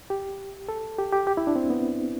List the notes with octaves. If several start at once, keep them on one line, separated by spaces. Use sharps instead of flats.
G4
A4
G4
G4
G4
E4
D4
C4
B3